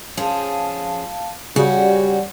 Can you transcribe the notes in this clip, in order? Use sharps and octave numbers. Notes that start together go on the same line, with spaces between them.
F3 C#4 G#4 F5 A5
C#3 G3 C#4 F#4 G4 D5 F#5